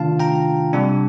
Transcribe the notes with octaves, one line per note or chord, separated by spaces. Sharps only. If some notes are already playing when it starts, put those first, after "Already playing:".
Already playing: C3 D#3 A3 D4 F4 F5 A5
G5 A#5
C3 G3 D4